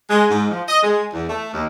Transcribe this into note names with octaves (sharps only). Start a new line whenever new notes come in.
G#3
G#2
F3
D#5
G#3
E2
A3
D#2